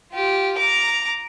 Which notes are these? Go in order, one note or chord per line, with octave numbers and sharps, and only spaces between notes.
F4 G4
A#5 D6